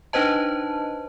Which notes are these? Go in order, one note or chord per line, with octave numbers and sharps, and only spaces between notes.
D4 D#4 B4 C5 D#5 A5